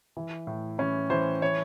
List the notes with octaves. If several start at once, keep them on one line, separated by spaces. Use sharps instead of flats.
E3
A2
E3 C#4
E3 C5
E3 C#5